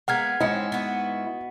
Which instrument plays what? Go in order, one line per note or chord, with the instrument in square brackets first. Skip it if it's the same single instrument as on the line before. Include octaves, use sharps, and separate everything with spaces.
[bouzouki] G#3 A#3 B3 [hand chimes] F#5 F6 G#6
[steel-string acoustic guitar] G#2 E4 [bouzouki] C4 C#4 [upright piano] D#5 C#7
[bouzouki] B3 F#4